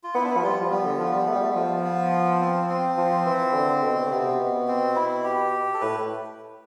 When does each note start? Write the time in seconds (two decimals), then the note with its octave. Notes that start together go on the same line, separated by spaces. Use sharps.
0.03 F4
0.15 B3 E4
0.24 D4
0.30 E4
0.37 F3
0.43 G3 F4
0.61 F3
0.71 G3 B3
0.85 D3
0.99 F3
1.14 G3
1.28 A3
1.35 G3
1.43 A3
1.51 G3
1.56 F3
1.84 B3
2.41 C4
2.69 C4
2.97 F3
3.26 E3
3.54 D3
3.83 B2
4.06 D3
4.11 C3 B3
4.40 B2
4.68 C4
4.96 E4
5.24 G4
5.74 A4
5.81 A2 B4